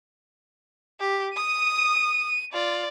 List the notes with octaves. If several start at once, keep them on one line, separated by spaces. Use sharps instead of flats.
G4
D#6 D#7
F4 D5